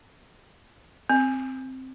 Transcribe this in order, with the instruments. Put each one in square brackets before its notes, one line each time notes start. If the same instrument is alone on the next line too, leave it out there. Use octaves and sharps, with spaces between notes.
[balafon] C4